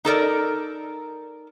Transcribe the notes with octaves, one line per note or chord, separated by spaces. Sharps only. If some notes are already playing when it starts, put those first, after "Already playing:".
D#4 A4 A#4 D5